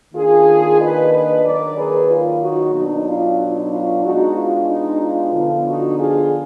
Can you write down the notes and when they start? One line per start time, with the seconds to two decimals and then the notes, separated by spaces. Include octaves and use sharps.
0.14 D#3 A#3 D4 F4 G#4
0.80 B4 D#5
1.12 B4 D#5
1.44 D#3 F#3 A#3 A#4 D5
1.76 G#4 B4
2.09 F4
2.41 D#4 F#4
2.74 B2 F#3 D4 D#4
3.06 F4
3.39 D#4
3.71 F4
4.03 B2 G#3 D4 D#4 F#4
4.36 F4
4.68 D#4
5.01 F4
5.33 D3 F3 B3 D4
5.66 D#4 F#4
5.98 F4 G#4